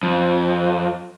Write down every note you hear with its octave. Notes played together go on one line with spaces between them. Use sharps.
F2